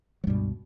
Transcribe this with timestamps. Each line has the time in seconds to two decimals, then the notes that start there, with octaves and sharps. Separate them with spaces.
0.24 F#3
0.27 C#2 G2 B2 G3